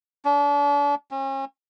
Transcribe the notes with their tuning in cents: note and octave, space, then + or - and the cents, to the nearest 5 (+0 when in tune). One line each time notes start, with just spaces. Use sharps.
D4 -40
C#4 -40